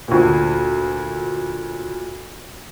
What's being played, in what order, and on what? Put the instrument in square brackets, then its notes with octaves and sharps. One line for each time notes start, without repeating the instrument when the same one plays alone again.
[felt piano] D2 A#2